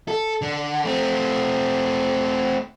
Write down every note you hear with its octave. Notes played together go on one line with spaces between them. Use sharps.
A4
D3
A3 C4